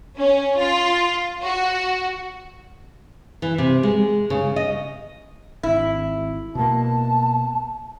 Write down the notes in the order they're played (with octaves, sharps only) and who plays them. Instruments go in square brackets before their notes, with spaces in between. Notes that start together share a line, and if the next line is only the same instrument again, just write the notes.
[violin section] C#4
F4
F#4
[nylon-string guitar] E3
C3
G#3
C#3
D#5
[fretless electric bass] G#1 [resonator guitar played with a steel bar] E4
[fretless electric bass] B2 A#3 [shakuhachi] A5